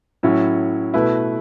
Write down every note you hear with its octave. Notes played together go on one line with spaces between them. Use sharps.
A2 F#3 C#4 E4
B2 A3 E4 B4